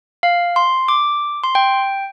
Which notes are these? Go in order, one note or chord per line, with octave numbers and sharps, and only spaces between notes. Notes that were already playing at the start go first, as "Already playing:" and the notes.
F5
C6
D6
C6
G5